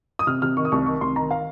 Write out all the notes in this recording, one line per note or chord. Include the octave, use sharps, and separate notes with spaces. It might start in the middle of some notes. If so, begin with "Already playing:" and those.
D#6
C3 F6
C3 F6
D#3 C#6
D#6
C2 C#6
D#3 C#6
C2 C6
D#3 A#5
F5